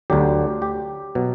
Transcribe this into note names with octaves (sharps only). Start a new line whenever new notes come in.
D2 D3 F#3 G4
G4
B2 F#3